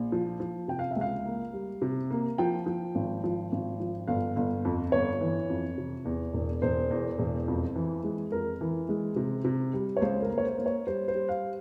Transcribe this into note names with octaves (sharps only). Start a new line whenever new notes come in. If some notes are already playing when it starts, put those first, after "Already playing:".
Already playing: A#1
F3
F3
C3 G5
F5
E5
C#2 F5
A#3
G3
C3
A#3
F3 G5
F3
G#1
F3
G#1
F3
G1 F5
G1
F2
G1 C#5
E3
F2
C3
E2
E1
E1 C5
E2
E1
F2
E3
G#3
F2 A#4
E3
G#3
C3
C3
G3
C#5
C#2 C5
A#4
A#3
C#5
C5
A#3
C#5
G3 C5
C5
G3
F5